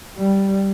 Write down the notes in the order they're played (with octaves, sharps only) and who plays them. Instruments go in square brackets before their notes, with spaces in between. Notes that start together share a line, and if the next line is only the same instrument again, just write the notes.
[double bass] G3